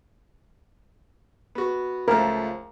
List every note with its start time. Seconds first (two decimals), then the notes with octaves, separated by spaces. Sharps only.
1.55 B3 F#4
2.08 C#2 F3 A3 A#4